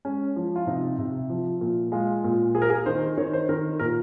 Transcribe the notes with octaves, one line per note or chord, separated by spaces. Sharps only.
G#3 C#4
F3
F4
C3 D#4
C3
F3
A#2
G#3 F4
A#2
A#3 G#4
A#4
G#4
D#3 C5
D#3 C#5
C5
D#3 A#4
A#2 A#4